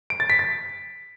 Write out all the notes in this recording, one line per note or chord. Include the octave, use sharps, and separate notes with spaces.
D7
A6
B6
A6